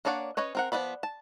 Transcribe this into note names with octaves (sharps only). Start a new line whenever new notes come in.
A#3 D4 C#5 D5 F#5
C#4 B4 C#5 D#5
C4 A#4 F#5
F3 B3 E4 D5 B5
A5